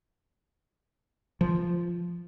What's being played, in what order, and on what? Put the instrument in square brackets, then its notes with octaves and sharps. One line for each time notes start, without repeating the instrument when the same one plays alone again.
[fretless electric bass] F3